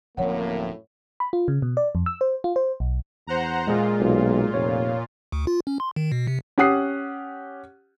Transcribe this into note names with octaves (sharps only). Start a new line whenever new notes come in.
D1 F#2 A2 F3 A#3 C4 C#5 F#5
B5
F4
C#3
B2
D5
F2
E6
C5
F4
C5
B1
E2 C5 F#5 A#5
A#2 G#3 F4 G#4
B1
F1 C#5
D2
F4
C#4
C6
D#3
B2
C3
C#4 G4 F#5 D#6 F#6 C7